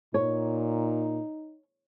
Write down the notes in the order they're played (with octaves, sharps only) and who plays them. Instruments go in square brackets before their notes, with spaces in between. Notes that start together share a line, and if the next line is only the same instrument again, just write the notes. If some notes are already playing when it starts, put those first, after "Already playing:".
[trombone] A#2 [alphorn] D#4 [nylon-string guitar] C#5